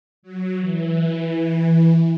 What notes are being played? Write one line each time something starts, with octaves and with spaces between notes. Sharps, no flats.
F#3
E3